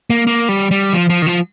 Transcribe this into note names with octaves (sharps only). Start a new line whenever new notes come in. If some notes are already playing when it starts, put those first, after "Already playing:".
A#3
A#3
G3
G3
F3
F3
D#3
F3